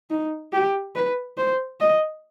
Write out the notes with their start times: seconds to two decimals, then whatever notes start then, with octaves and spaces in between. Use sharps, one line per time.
0.10 D#4
0.53 G4
0.95 B4
1.38 C5
1.80 D#5